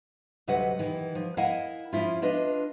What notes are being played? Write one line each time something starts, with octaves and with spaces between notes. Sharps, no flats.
D2 C3 F#3 B4 D#5 F#5
D#3 E3
F3
E4 A#4 D#5 F5 F#5 G#5
F3 C#4 E4 F4
D4 F4 B4 D#5